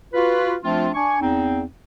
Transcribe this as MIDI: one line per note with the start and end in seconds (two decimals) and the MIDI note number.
0.13 0.54 65
0.13 0.54 66
0.13 0.54 71
0.63 0.89 53
0.63 0.89 57
0.63 0.89 60
0.63 0.89 62
0.63 0.89 65
0.94 1.20 62
0.94 1.20 80
0.94 1.20 85
1.21 1.63 40
1.21 1.63 60
1.21 1.63 63